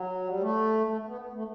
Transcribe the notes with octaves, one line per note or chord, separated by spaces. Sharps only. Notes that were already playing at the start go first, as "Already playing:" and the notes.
Already playing: F#3
G3
A3
A3
B3
A3